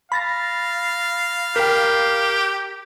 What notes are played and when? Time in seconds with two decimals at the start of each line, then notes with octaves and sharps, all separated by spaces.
0.12 F5 B5 A6 A#6
1.56 G4 A#4 G5